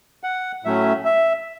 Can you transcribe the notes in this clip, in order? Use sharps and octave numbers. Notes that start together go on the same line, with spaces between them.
F#5
A2 F#3 A3 C#4 E5
E5